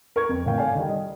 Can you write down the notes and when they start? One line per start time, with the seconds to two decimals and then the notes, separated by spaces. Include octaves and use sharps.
0.16 A#4 C#6 G#6
0.29 F2
0.46 A1 D#3 F5 G5
0.58 A4 C#5 D5 F5 G5 G#5
0.75 D#3 G3
0.89 D#5